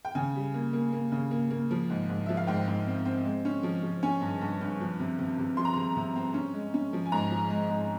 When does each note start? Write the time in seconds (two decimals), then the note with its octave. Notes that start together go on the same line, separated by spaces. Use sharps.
0.05 G5
0.15 C#3 G#5
0.36 G3
0.54 A#3
0.73 A#3
0.93 A#3
1.12 C#3
1.31 A#3
1.51 A#3
1.71 F3
1.90 G#2
2.09 G#2
2.26 F3 E5
2.37 F5
2.47 G#2 G5
2.68 G#2
2.87 C4
3.05 C4
3.25 G#3
3.45 C#4
3.63 F3
3.83 F3
4.03 C#4 G#5
4.21 G2
4.41 G2
4.61 G2
4.80 F3
4.99 C3
5.19 C3
5.38 C3
5.57 F3 C6
5.65 A#5
5.73 C3 C6
5.96 C3
6.16 C4
6.34 C#4
6.54 G#3
6.74 C#4
6.93 F3
7.06 G#5
7.12 G#2 A#5
7.31 F3
7.50 G#3
7.70 G#2